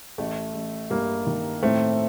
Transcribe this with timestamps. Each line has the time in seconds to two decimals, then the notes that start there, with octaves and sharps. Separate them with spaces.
0.18 A1 A3
0.55 A1
0.90 G2 A#3
1.26 D#3
1.63 A2 A3 C4